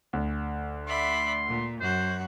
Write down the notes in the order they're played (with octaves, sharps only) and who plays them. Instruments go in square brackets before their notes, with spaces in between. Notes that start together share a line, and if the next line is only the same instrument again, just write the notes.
[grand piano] D2
[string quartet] D5 E5 B5 [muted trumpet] C6
[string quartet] A#2
[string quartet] F#2 F#4 [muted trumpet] C5